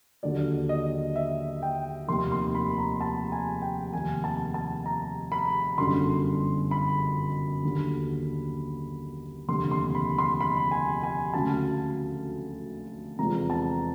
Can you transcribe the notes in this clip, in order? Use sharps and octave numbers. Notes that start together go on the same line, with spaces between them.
D#2 D3 F#3 D5
D#5
E5
G5
F1 D#2 D#3 C6
C6
B5
A#5
A5
G#5
G5
F1 D#2 D#3 G#5
A5
A5
A#5
B5
G1 F#2 D3 G3 C6
B5
D#2 D3 F#3
F1 D#2 D3 C6
C6
B5
C6
B5
G#5
G#5
D2 C#3 F#3 A5
E2 C3 F3 G#3 A#5
A5